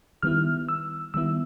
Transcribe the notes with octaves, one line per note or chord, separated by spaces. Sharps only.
D#3 G3 B3 E4 F6
E6
D#3 G3 B3 E4 E6